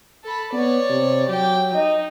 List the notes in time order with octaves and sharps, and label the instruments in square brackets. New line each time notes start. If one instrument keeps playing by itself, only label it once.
[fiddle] A4 B5
[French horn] B3 [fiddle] C#5 D5
[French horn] C3
[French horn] F#3 [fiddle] G4 G5
[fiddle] D#4 [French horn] D#5